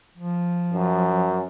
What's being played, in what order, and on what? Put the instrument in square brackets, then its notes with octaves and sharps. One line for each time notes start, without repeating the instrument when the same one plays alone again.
[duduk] F3
[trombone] F#2